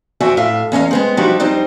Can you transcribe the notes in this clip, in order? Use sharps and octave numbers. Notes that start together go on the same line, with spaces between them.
F2 D4 F#4 E5 G5 G#5
A2 E5 F5
E2 C#4 D#5 F5
G#3 B3 C4
F3 G3 D4 D#4 F#4 G4
F2 G3 C4 D#4 C5